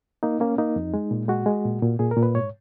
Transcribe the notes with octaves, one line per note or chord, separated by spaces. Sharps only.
A#3 D#4
A#3 C#4
A#3 D#4
F2
G#3
A#2
G#3 F#4
G#3
A#2
A#2
A#2 G#4
A#4
A#2
B4
G#2 C#5